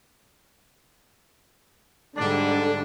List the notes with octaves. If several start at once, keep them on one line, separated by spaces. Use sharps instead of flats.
G#2 D3 G3 D4